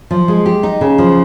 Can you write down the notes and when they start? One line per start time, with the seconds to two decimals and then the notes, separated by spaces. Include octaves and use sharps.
0.11 F3
0.28 G#3
0.46 G4
0.63 D#4
0.81 C#3
0.98 F3